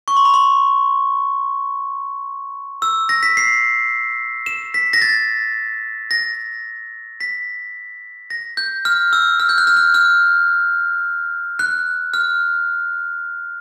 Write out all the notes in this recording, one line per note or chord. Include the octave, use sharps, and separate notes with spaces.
C#6
C6
B5
C6
E6
A#6
B6
C7
E7
B6
A#6
A6
A#6
B6
A#6
G6
F6
E6
F6
G6
F#6
F6
F#6
F6
F#6
F6